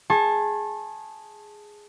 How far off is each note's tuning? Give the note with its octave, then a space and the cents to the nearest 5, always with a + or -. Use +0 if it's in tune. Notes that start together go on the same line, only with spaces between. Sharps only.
G#4 +0 A5 +0 C#6 -40